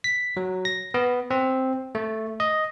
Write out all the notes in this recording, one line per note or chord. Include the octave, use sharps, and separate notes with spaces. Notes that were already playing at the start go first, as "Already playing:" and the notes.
B6
F#3
A#6
B3
C4
A3
D#5